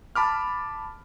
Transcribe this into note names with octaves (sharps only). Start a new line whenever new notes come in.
A5 B5 D6 F6